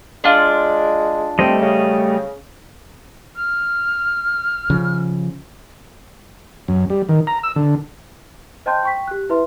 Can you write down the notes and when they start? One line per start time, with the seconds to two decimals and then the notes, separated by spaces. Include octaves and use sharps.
0.24 G#3 D4 F4
1.39 G3 A3 C4 D#5
1.61 C#3
3.36 F6
4.70 C#3 F3
6.68 F#2
6.90 G3
7.09 D#3
7.27 A#5
7.43 E6
7.56 D3
8.66 C5 D#5 G5 A5 C6 G6
8.83 G5 C#6 B6
9.08 G4 F#6
9.29 E4 B4 E5 C6